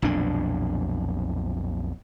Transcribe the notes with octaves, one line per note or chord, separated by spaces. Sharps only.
B1 F2 A#2 D4